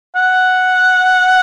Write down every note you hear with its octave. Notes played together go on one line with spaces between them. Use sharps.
F#5